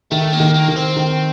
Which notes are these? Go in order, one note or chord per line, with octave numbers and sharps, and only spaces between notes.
D#3 A3
A#3
D#3
A#3
D#3
C4
D#3